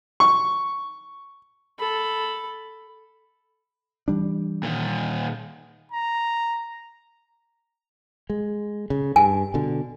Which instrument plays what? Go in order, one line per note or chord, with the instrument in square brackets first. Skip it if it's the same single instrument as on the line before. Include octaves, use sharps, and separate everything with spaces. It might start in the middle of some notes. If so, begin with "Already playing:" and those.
[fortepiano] C#6
[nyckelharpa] A4 B5
[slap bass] E3 G3 D4
[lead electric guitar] A#2 D#3
[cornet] A#5
[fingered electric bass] G#3
C#3
[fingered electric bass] G2 [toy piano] G#5
[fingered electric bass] B2 D3